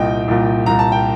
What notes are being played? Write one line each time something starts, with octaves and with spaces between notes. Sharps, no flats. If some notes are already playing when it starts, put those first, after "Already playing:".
Already playing: C2 A#2 D#5 G5
C2 A#2
C2 A#2 A#5
A5
G5